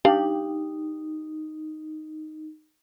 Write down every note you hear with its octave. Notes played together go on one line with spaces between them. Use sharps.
D4 D#4 G4 F5